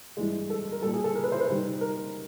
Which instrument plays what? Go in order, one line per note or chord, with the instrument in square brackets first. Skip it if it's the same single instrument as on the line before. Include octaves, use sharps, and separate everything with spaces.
[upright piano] G2 E3 G#3
A4
A#4
A#2 G3 A4
G#4
A4
A#4
B4
C5
B4
C3 D#3 G3
A#4